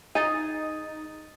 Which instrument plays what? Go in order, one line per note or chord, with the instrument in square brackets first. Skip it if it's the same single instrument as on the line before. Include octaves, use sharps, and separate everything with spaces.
[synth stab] D#4 [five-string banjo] G#4 [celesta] D#6 A6 D#7